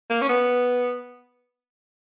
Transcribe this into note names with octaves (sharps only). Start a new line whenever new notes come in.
A#3
C#4
B3